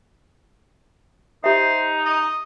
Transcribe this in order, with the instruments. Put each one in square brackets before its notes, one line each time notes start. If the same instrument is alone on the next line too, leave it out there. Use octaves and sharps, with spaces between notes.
[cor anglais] D#4 [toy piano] G4 E5 [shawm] C5
[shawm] D#5